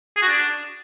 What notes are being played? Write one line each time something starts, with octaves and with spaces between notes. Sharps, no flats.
G#4
F#4
D4